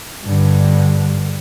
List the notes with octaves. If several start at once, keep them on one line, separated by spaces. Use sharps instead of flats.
G2 D3